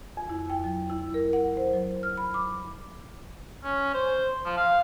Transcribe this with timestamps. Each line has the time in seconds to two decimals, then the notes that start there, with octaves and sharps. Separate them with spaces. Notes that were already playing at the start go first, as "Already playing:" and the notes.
0.17 F2
0.30 E4
0.50 G5
0.64 F#3
0.90 E4
1.14 A#4
1.33 F#5
1.57 C5
1.73 F#3
2.03 F6
2.18 B5
2.34 D6
3.64 C#4
3.94 C5
4.45 F3
4.57 F5